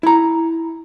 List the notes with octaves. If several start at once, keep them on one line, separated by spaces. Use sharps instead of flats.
E4 A#5